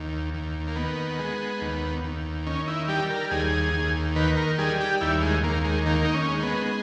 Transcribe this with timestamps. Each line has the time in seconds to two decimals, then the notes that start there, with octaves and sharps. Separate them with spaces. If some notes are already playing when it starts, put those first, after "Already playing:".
Already playing: D#2
0.34 D#2
0.67 A#3
0.76 D#3 B3
1.19 G#3
1.61 D#2
2.04 D#2
2.46 D#3 C#4
2.68 E4
2.88 G3 G4
3.10 A#4
3.31 D#2 G#4
3.74 D#2
4.16 D#3 B4
4.37 A#4
4.58 G3 G#4
4.81 G4
5.01 D#2 E4
5.22 G#3
5.43 D#2 A#3
5.65 G#3
5.86 D#3 A#3
6.05 D#4
6.14 C#4
6.28 G#3
6.43 B3